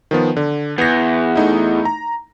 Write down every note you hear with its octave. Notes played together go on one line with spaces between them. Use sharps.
D#3 F3 B3
D3
E2 B3 A#6
A3 D#4 E4
A#5